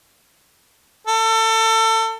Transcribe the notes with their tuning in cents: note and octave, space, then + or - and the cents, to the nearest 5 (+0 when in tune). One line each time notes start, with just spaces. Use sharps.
A4 +30